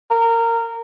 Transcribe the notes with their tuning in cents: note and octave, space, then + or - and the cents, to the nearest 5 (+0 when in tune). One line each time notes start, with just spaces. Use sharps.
A#4 -20